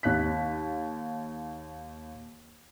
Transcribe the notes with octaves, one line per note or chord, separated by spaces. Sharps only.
D#2 F#6 B6